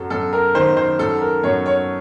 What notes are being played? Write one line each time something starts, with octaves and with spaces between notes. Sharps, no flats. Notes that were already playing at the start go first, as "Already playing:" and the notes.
Already playing: F#2 F#3 A4
F#2 A4
A#4
D#3 C5
C5
F#2 A4
A#4
F#2 C#5
C#5